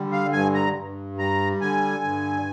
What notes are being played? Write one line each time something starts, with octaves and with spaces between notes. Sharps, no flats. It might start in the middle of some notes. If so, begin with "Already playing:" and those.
Already playing: D3 G3
F5
G2 G#5
A#5
G2
G3 A#5
D3 G#5
G2